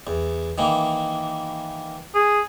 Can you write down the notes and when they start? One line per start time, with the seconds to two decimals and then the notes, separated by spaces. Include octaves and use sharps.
0.07 E2
0.58 D#3 E3 A#3
2.15 G#4